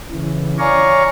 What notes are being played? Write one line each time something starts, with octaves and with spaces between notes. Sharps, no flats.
C#3 E3
C#5 D5 F5 G#5 A#5 C#6